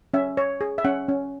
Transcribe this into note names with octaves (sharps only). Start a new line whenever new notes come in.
C#4 E5
C#5
G#4
E5
C#4 F#5
C#4